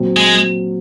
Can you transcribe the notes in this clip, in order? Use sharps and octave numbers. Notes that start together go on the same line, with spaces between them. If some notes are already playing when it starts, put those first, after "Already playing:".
Already playing: A#2 F#3 C4
G#3